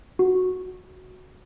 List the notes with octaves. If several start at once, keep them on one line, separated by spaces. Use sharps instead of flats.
F#4